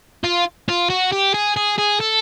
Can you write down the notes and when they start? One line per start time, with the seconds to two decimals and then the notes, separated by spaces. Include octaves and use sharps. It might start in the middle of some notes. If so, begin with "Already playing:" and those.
0.24 F4
0.69 F4
0.90 F#4
1.12 G4
1.34 G#4
1.57 G#4
1.78 G#4
2.00 A4